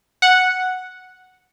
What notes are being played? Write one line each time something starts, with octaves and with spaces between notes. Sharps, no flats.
F#5